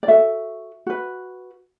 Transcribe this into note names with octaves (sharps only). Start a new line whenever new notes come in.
D5
F#4 A4 E5
F#4 B4